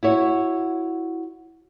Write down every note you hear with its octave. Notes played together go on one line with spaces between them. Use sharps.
E4 F#4 C#5